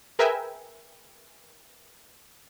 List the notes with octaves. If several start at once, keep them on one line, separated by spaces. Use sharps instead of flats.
G#4 A#4 B4 E5 G5 G#5